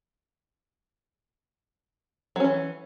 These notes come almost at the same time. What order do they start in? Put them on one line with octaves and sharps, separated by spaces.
F#3 C#4 E3